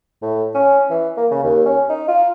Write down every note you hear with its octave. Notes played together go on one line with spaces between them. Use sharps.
A2
C#4
E3
A#3
C#3
D#2
C#4
D#4
F4